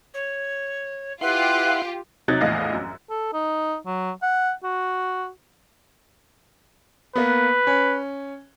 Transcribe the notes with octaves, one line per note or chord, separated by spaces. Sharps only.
C#5
E4 F4 G4 B4 F#5 C6
C3 F#3 D#4 F#6 G#6 A6
A#1 E2 A2 D#5 F5
F#2
A4
D#4
F#3
F#5
F#4
A#3 B3 B4
C#4